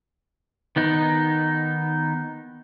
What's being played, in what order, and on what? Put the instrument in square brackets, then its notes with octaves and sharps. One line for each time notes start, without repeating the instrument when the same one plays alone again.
[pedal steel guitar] D#3 B3 D#4